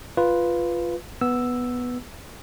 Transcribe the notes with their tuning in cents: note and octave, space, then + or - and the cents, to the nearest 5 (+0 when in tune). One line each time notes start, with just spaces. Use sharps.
F4 +0 B4 +0
B3 +0 E6 +0